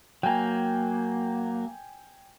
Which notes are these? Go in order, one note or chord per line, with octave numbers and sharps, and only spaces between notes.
F#3 A#3 G5 G#5